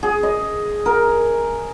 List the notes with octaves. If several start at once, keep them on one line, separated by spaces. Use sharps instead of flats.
G#4
D#5
A#4